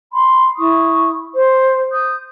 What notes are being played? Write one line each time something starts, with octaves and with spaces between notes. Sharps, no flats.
B5 C6
E4 C#6 D#6
C5
D#6 G6